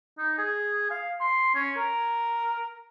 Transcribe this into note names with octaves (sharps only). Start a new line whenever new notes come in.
D#4
G#4
F5
C6
C#4
A#4